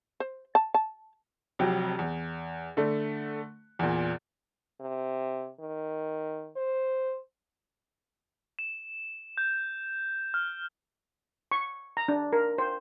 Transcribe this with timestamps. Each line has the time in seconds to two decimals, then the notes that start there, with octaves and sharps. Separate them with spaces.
0.20 C5
0.55 A5
0.74 A5
1.59 F1 F2 C3 F#3 G5
1.99 E2
2.77 D3 A3
3.79 E2 A#2
4.80 C3
5.60 D#3
6.56 C5
8.59 E7
9.37 G6
10.34 F6
11.52 C#6
11.97 A#5
12.08 D4
12.33 A#4
12.58 C5